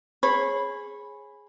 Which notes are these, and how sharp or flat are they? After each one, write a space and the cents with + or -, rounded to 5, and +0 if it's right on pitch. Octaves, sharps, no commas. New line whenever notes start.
G#4 +0 C#5 -25 B5 +0